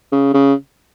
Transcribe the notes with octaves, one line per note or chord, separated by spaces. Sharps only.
C#3
C#3